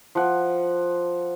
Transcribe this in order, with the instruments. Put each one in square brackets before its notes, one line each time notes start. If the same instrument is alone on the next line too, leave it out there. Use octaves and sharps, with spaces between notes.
[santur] F3 F#5